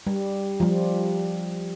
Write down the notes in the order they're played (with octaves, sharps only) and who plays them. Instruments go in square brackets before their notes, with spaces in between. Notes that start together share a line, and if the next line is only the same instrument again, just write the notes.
[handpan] G3
F3 G3